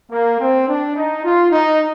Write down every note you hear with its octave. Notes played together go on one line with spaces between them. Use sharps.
A#3
C4
D4
D#4
F4
D#4